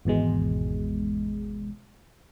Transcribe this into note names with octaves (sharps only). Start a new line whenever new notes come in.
G#1 E2 B2 G#3